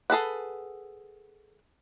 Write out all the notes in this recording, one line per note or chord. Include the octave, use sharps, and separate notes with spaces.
G#4 A4 B4 F#5